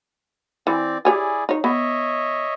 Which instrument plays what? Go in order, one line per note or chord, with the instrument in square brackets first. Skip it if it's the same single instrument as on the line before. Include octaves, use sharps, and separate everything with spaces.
[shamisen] E3 [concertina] C4 D5
[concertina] E4 G#4 D5 [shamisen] G4 C#5 G#5
[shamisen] D#4 C#5
[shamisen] B3 [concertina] C#5 D#5 E5